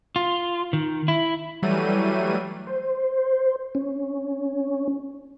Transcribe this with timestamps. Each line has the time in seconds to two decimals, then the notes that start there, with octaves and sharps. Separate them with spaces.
0.16 F4
0.73 D#3
1.08 E4
1.62 E3 F#3 G3 A3 D#7
2.67 C5
3.75 C#4